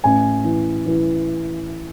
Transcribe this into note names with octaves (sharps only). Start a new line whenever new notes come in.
A1 G#5
E3
E3